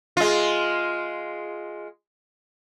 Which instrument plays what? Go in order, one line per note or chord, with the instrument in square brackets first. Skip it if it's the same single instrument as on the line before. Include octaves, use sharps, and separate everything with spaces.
[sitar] G#3 F4